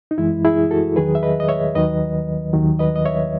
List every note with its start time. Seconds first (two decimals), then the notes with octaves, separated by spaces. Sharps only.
0.11 D#4
0.18 F#2 E3 G#3 E4
0.45 E4 G#4
0.71 F#4 A4
0.96 E2 D#3 F#3 G#4 B4
1.15 E5
1.23 B4 D#5
1.40 D#5
1.49 C#5 E5
1.75 D#2 D#3 F#3 B4 D#5
2.53 D#2 D#3 F#3
2.79 B4 D#5
2.96 D#5
3.06 C#5 E5